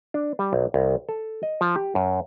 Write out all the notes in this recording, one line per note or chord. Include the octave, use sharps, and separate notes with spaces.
D4
G3
B1
C2
A4
D#5
F3
G4
F#2